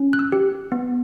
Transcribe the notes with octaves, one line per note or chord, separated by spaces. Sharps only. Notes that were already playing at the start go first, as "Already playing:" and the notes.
Already playing: C#4
F#6
E6
G4
B3